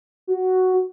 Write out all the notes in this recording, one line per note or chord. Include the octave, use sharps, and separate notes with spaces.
F#4